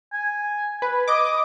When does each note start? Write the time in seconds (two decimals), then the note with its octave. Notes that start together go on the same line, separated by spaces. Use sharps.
0.12 G#5
0.82 B4
1.08 D#5 D6